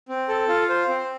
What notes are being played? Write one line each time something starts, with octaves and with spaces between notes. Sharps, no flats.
C4
A4
F4
C5
C4